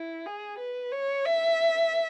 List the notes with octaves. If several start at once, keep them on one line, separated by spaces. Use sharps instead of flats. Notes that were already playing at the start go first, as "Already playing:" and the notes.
Already playing: E4
G#4
B4
C#5
E5